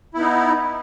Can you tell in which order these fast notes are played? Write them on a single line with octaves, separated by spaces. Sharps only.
E4 B3 D#4